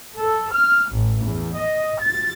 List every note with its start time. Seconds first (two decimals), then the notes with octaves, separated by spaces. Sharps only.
0.18 A4
0.53 F6
0.92 A1
1.25 E2
1.58 D#5
2.02 A6